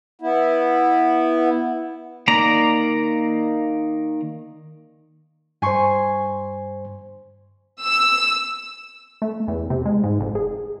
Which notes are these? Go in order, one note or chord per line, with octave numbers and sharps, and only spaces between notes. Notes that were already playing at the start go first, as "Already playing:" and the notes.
B3 E4
D#3 A#3 D5 A#5
G2 C5 G#5 C6 C#6
E6
A3
E2
C3
G#3
G#2
F1
G#4